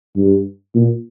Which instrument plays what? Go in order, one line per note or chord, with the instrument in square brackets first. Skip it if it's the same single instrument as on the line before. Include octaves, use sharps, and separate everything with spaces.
[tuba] G2
A#2